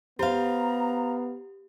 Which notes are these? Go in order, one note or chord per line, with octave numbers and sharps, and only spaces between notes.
B3 G4 C5 F5 A#5